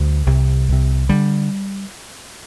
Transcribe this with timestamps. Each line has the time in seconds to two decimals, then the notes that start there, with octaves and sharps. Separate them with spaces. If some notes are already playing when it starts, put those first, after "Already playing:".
Already playing: D2 G3
0.26 C2 C3
0.68 C2 C3
1.09 D3 G3